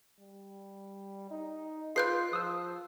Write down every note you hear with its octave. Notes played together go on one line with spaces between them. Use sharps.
G3
D#4
F4 G#4 B4 F#6 G6 C7
F3 D#6 E6